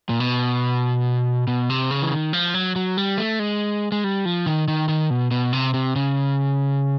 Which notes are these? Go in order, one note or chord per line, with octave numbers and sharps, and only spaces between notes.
A#2
B2
B2
C3
C#3
E3
D#3
F3
F#3
F#3
G3
A3
G#3
G#3
G3
F3
D#3
D#3
D#3
B2
B2
C3
C3
C#3